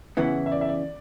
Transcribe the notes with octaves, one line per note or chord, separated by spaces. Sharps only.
E2 C#3 E3 B3 E4 F#5
E5
D5
E5
D5